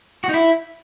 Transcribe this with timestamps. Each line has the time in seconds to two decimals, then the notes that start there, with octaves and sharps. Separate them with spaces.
0.24 F#4
0.29 D#4
0.34 E4